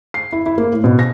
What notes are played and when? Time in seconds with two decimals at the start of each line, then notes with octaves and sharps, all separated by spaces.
0.14 C7
0.33 E4
0.46 E4
0.58 A#3
0.72 A2
0.84 B2
0.99 A#6